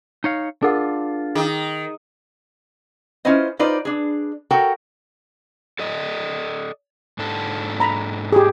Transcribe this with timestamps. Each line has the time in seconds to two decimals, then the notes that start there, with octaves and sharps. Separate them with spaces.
0.24 D#4 C#5 F5
0.62 D4 F4 G#4 A#4 F#5
1.35 D#3 G#4
3.25 C#4 E4 F4 B4 C5 D#5
3.59 D#4 F4 B4 C5 D5
3.85 D4 G#4
4.51 F#4 A4 A#4 C#5 F#5 G5
5.79 A4 D5 D#5
7.19 G#2 D4 A4
7.80 A#5 B5
8.32 G4 G#4